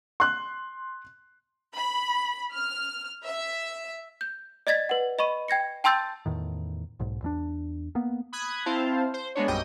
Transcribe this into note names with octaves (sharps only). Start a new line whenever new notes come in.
C6 F#6
B5
F6
E5
G6
D5 D#5 G#6 A6 B6
B4 F#5
D#5 B5 C#6 D#7
G5 G#6 A#6 C#7
G5 A5 C6 E6 G6 A6
E2 A2 D#3
B1 G#2
E2 G3 D4
A#3 B3
B5 D#6 F#6 G#6
C4 E4 C5 F5 A5
C5
G#3 B3 D4 C#5
A#1 F#2 G3 D#5 G5 D#6